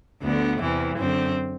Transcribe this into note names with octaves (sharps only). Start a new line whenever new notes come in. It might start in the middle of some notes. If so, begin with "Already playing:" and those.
D2 D3 B3
E2 C3 E3
F#2 D3 C4